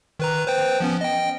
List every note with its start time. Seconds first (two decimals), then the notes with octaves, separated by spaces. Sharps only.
0.19 D#3 B4 A#5
0.46 B4 C5 G5
0.80 F3 B3 C#4
1.01 D#5 G5